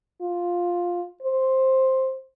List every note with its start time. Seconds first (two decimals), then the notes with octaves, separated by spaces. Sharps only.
0.22 F4
1.23 C5